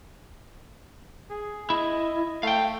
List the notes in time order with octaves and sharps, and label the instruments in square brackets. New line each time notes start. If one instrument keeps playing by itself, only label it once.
[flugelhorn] G#4
[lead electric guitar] E4 [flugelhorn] D#5
[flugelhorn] A3 [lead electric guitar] F5 G5